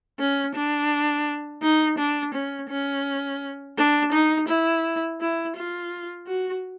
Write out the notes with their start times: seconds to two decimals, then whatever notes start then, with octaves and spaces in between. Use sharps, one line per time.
0.19 C#4
0.55 D4
1.62 D#4
1.98 D4
2.34 C#4
2.69 C#4
3.78 D4
4.12 D#4
4.48 E4
5.20 E4
5.56 F4
6.27 F#4